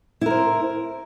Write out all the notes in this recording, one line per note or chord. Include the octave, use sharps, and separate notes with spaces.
E4 A#4 C5